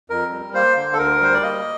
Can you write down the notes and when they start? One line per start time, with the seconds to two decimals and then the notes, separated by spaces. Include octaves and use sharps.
0.10 F2 A#4
0.32 G3
0.54 A#3 C5
0.77 D3
0.93 A4
0.98 D2 A#4
1.21 G3 C5
1.34 D5
1.43 A#3 D#5